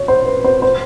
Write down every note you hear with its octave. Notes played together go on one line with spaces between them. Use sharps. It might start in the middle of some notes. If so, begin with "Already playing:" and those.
Already playing: C#5
C5
B4
C5
C5